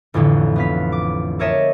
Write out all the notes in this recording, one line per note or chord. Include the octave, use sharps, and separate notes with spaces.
A1 F2 A2 D3
B3 F5 B6
D6
A4 A#4 C#5 D#5 E5 A5